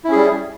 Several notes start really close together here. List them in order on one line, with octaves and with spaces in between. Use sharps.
E4 C#4 G#4 G3